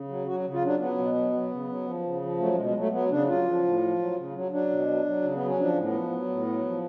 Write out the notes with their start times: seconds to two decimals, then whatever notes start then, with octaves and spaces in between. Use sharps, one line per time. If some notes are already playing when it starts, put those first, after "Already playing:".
Already playing: C#3
0.08 F#3
0.26 F#3 F#4
0.45 C#3
0.54 F4
0.62 F#3 D4
0.80 F#3 B3
0.98 B2
1.15 F#3
1.33 F#3
1.51 C#3
1.68 F#3
1.86 F3
2.04 C#3
2.21 F3
2.39 F#3 A3
2.53 B2 G#3
2.65 G#3
2.75 F#3 A3
2.92 F#3 B3
3.10 C#3 D4
3.28 F#3 F4
3.46 F3
3.63 A2
3.82 F3
3.99 F#3
4.16 C#3
4.34 F#3
4.52 F#3 D4
4.70 B2
4.87 F#3
5.05 F#3
5.22 C#3
5.35 B3
5.40 F#3
5.46 C#4
5.58 F3 D4
5.76 A2
5.85 B3
5.93 F3
6.12 F#3
6.29 A2
6.47 F#3
6.65 F3